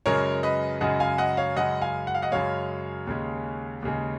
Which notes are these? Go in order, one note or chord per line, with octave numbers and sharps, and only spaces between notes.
F#2 C#3 G#3 A#4 C#5
B4 D#5
F#2 C#3 G#3 D#5 F#5
F5 G#5
D#5 F#5
C#5 F5
F#2 C#3 G#3 D#5 F#5
F5 G#5
F#5
F5
D#5 F#5
F#2 C#3 G#3 C#5 F5
D#2 C#3 G#3
D#2 C#3 G#3